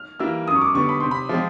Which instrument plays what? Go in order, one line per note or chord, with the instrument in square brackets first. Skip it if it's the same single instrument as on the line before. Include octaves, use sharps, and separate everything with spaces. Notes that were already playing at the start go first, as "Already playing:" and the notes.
Already playing: [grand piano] F6
[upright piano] E3 G3 A#3 [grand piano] E6
[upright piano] F#2 [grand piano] D#6
[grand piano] C#6
D6
[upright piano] D3 G3 B3 [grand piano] C#6
[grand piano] B5
[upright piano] C3 [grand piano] C6
[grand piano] B5
[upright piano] F3 G#3 C4